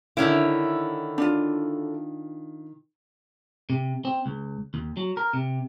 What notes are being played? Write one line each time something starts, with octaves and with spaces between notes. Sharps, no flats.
D3 D#3 C#4 E4
D4 F4
C3
C4
C#2
D#2
F#3
A#4
C3